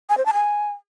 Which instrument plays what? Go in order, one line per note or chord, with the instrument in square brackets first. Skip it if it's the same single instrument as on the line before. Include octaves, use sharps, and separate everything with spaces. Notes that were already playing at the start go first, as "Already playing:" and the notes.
[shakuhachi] G#5
C5
A5
G#5